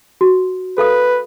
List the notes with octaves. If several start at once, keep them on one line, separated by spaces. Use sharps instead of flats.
F#4
A4 B4 F5 D#6